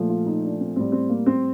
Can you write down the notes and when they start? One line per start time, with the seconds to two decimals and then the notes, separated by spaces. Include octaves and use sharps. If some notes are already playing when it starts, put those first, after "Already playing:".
Already playing: A#2 F3 A3
0.09 F4
0.26 D#4
0.43 D4
0.60 C4
0.76 A2 G3 C4
0.92 C4
1.09 A#3
1.26 C4